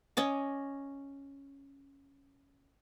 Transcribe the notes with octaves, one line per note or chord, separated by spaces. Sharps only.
C#4 D#5 D6